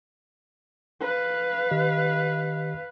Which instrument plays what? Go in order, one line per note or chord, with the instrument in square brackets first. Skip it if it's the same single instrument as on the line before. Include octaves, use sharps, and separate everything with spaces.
[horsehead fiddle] B4 F5
[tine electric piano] D#3 G4 D#5